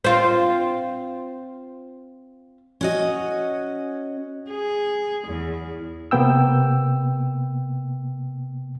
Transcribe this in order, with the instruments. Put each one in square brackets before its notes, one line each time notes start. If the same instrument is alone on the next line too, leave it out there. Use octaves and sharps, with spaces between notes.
[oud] C4 F4
[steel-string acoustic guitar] C#4 F#4 D#5
[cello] G#4
E2
[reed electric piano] C3 A#3 B3 G5 E6